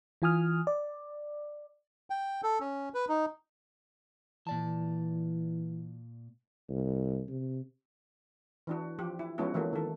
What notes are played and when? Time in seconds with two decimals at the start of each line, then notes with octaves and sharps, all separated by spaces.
0.22 E3 F4 G#5 D#6 F6
0.67 D5
2.10 G5
2.43 A4
2.61 C#4
2.94 B4
3.08 D#4
4.47 A#2 E3 D5 A5
6.69 C2
7.28 C3
8.67 E3 D4 F#4
8.99 F3 G4
9.19 E4
9.38 F3 G#3 B3 C#4 E4 F#4
9.54 E3 F#3 A#3 A4
9.73 D#3 A4